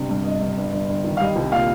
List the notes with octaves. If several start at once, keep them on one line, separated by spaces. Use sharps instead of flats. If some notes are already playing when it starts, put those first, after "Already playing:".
Already playing: G1 C3
G2
G1 D#5
G2
G1
G1
G1
D#3
F5
G3 D#5
C2
A#2 F5